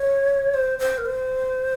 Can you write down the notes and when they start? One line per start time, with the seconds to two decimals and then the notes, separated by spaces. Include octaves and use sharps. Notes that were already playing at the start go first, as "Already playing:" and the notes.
Already playing: C#5
0.54 C5
0.79 C5
0.98 A#4
1.05 C5